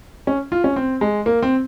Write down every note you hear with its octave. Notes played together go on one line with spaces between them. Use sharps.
C#4
F4
C#4
C4
G#3
A#3
C4